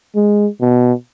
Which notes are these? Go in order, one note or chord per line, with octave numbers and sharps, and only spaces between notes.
G#3
B2